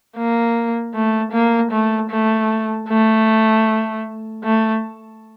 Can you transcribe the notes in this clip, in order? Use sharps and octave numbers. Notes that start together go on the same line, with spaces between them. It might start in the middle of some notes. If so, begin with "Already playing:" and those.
A#3
A3
A#3
A3
A3
A3
A3